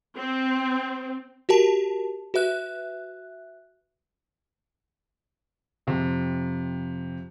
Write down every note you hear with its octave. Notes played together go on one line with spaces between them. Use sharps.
C4
F#4 G4 A#4 A5
F#4 B4 E5 F#6
F2 C3